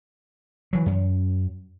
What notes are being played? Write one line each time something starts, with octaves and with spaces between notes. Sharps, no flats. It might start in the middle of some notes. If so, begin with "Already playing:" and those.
E3 F#3
F#2